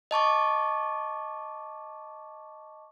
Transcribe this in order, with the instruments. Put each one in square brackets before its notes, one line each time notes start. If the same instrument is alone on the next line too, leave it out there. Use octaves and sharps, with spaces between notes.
[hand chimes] D#5 A5 C#6 D6